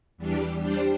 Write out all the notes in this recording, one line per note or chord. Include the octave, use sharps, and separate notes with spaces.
E2 E3 G3 D4 G4
G3 D4 G4 C5